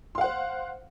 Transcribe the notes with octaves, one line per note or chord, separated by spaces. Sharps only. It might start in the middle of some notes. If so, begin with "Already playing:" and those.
C5 F5 F#5 C6